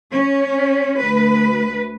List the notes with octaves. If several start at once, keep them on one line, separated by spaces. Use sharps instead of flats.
C#4
D2 B4